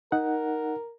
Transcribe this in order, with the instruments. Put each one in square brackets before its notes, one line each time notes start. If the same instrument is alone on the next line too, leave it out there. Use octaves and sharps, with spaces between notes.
[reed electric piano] D#4 F#5 [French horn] A#4